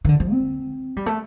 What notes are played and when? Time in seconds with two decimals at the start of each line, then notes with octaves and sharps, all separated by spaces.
0.05 D#3
0.09 D3
0.20 F3
0.32 C4
0.97 G3
1.06 A3